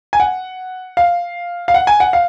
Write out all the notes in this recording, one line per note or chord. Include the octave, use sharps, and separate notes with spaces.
G#5
F#5
F5
F5
F#5
G#5
F#5
F5